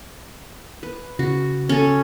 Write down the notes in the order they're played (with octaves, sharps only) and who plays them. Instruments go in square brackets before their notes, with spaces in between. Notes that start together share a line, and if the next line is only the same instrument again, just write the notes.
[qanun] B4
[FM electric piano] C#3 [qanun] F#4
[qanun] C#4 A4